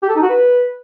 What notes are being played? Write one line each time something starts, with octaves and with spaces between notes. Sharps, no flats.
G4
A4
D#4
F#4
B4